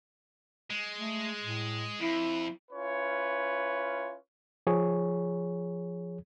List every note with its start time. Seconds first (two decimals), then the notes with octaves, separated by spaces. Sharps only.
0.70 G#3
0.99 A3
1.41 A2
2.01 F2 E4
2.71 C#4 E4 F4 B4 C#5
4.67 F3 G#4 C#5